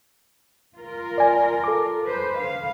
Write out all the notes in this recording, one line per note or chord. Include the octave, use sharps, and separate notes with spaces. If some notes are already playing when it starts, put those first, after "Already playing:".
F4 A#4
D5 G#5
A4 D6
B4 C5
F5